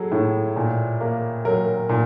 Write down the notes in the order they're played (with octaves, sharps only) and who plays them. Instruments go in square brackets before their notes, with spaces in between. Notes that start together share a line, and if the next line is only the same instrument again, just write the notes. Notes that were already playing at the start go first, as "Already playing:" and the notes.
Already playing: [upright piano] F#3 G#4 A4
A2
A#2
A#3
F#3 A#4
A#2